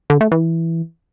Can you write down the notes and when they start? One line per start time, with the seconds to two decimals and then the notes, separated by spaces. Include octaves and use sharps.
0.10 D3
0.21 A3
0.32 E3